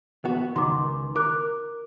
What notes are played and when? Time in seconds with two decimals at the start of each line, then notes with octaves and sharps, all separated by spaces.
0.25 B3 F#4
0.56 C#2 D#3 C6 D6
1.16 A#4 D6 F#6